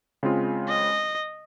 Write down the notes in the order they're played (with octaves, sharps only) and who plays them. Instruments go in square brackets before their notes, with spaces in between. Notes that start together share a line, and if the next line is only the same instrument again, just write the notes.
[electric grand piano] C#3 G#3 C4 F4
[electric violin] D#5